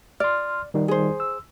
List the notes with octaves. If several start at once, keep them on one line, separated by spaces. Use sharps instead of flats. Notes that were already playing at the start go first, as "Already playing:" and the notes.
D5 C6 F6
D#3 G3 D#4
G#4 C5
E6